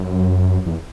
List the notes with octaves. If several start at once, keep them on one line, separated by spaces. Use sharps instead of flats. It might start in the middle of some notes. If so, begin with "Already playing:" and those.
Already playing: F#2
E2